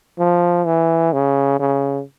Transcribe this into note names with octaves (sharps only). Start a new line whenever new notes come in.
F3
E3
C#3
C#3